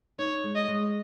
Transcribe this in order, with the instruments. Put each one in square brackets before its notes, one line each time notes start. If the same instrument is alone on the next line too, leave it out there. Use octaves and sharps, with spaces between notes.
[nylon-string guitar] D#4 [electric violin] C#5
[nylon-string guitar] G#3
[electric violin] D#5
[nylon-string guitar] G#3